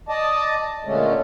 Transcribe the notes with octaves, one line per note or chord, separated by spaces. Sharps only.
D5 D#5 A5
A#2 D3 G#3 A3 C#4